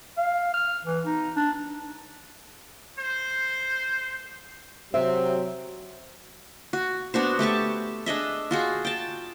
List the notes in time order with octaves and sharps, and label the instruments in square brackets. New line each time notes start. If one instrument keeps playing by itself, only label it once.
[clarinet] F5
F6
E3
D#4
D4
[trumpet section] C5
[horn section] C3 C4 [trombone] F#3 [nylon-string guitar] E5
[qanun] F#4
B3 D4 F#4 C5
A3 G4 A5 C#6
D4 G#4 D#5 E5
F4 F#4 G#4
G5 A5